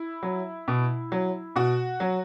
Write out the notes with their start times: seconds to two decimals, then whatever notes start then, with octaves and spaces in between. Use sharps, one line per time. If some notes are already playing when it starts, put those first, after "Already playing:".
Already playing: E4
0.23 F#3
0.68 B2
1.12 F#3
1.56 B2 F#4
2.00 F#3